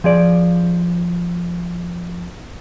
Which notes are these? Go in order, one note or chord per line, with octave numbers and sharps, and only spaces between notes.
F3 G#4 D5